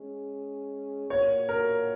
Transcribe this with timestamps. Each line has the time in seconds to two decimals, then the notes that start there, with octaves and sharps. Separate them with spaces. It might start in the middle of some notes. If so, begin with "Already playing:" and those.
Already playing: G#3 C#4 G#4
1.09 A#2 A#3 F#4 C#5
1.49 A#4